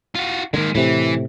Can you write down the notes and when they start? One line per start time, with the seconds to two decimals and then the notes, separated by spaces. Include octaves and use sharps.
0.15 F4 F#4
0.54 D3 D#3 G#3 A#3
0.75 A2 C3 E3